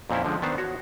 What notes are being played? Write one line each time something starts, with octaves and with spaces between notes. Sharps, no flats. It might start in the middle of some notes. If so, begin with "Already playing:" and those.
F2 A#2 C4 C#4 E4
D3 F3 G#3
D#3 B3 D4 C5
F#4 C#5 F#5